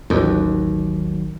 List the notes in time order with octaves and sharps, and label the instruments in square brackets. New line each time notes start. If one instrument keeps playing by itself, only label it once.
[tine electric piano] A1 D#3 F#3 [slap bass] D#2